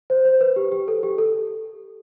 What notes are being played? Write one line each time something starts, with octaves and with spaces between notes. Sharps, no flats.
C5
C5
B4
G4
G4
A4
G4
A4